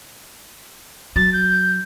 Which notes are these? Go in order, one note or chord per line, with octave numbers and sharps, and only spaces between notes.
F#3 A6
G6